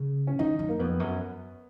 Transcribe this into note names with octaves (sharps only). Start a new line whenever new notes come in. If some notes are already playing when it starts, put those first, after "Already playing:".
Already playing: C#3
C#4
D#3 D#4
F#2
A#3
F2 B3
F#2